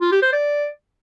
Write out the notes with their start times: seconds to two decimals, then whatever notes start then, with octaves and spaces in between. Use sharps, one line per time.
0.01 F4
0.12 G4
0.22 C5
0.33 D5